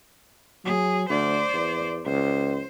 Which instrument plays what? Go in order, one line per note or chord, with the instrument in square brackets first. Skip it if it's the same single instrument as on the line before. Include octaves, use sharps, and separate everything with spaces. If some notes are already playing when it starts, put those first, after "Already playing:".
[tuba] F#3 [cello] G#4
[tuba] D2 [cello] C5 D5
[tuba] E2
[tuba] C#2 [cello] C5